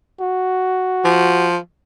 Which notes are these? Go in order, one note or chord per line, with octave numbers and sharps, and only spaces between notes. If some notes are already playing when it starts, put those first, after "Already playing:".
F#4
F3